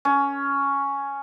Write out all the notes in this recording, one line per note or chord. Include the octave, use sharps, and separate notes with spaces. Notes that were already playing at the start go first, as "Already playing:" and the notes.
C#4